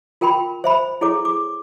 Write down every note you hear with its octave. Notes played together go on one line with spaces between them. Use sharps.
F4 A#4 G5 B5 C6
C5 E5 B5
E4 G#4 A4 C#5 D6
D6